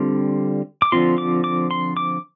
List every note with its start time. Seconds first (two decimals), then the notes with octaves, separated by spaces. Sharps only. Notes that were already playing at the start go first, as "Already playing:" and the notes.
Already playing: D3 G3 C4 F4
0.82 D6
0.92 D3 F3 C4 F4 C6
1.18 D6
1.44 D6
1.71 C6
1.97 D6